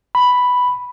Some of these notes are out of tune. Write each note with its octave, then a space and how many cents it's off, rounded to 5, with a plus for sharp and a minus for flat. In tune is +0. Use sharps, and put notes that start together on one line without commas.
B5 +0